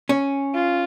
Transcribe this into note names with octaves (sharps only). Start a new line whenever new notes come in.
C#4
F4